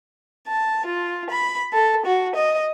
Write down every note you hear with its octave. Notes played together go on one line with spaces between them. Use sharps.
A5
F4
B5
A4
F#4
D#5